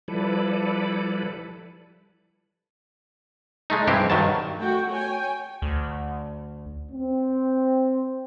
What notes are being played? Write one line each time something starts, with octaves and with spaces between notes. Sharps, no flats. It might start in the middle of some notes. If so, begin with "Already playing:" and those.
F3 G3 E4 A4 B4 D5
G#3 A3 D#4
G2 G#3 C4 E4 G4
G2 D#3 F#3 A5
A3 F#4 G5
C#5 G5 G#5
D2
C4